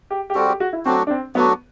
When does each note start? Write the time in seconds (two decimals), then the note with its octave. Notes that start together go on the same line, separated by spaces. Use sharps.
0.10 G4
0.30 G4
0.35 G3 C4 F#4 A4
0.48 G4
0.60 F#4
0.73 E4
0.85 F#3 A3 C4 D4 F#4
1.07 D4
1.10 C4
1.35 F#3 A3 B3 D4 F#4